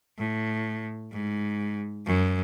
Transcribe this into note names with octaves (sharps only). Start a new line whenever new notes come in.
A2
G#2
F#2